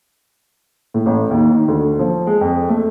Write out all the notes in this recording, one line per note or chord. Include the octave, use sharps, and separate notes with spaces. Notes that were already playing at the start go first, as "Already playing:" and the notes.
A2
A1
D#2
D#3
D2
F3
G#3
F2
A3